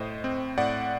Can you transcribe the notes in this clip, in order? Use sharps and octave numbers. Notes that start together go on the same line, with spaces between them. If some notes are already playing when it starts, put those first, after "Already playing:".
Already playing: A2 C5 D#5
C4
A2 D5 F#5